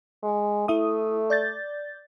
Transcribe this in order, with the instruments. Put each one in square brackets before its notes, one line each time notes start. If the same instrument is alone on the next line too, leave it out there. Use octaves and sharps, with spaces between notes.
[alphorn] G#3
[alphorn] A3 [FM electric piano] E4 E5 D#6
[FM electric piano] D5 G6 A6